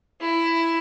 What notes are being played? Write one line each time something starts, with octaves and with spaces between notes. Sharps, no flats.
E4